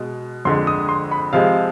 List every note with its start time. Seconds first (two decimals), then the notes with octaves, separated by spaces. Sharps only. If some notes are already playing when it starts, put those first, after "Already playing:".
Already playing: B2 G#3
0.45 F2 D3 G#3 C6
0.67 D#6
0.89 C6
1.11 B5
1.33 C3 F3 G#3 F5